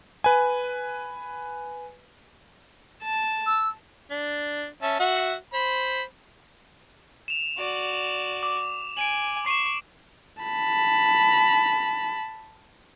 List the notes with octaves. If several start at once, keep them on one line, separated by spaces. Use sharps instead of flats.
B4 G#5
A5
E6
D4
C#4 E5 A5
F#4 E5 F#5
C5 B5
E7 F7
F#4 D5
D6
G#5 D7 D#7 F#7
C#6 C7 D#7 E7
A5 B5